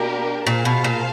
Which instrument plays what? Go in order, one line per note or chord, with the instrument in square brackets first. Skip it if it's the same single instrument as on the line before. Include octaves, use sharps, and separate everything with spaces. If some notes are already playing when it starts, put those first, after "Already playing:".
Already playing: [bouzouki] B2 [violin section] A#3 D4 G4 A#4
[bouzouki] A#2 [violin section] G#4 C5 F5 A5
[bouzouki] B2
A#2